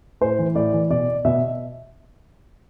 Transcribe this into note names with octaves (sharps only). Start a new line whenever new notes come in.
A2 C5
E3
A2 D5
E3
B2 D5
B2 E5